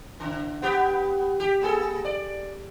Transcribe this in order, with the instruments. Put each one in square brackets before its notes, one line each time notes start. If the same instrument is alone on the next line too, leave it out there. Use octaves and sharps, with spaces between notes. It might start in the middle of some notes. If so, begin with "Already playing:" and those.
[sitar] C#3
B3 G4
G4
A#3 G#4 A4
D5